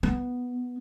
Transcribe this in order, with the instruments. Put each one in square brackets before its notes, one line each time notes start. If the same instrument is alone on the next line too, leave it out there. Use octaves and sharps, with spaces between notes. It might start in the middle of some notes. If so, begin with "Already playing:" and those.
[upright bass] B3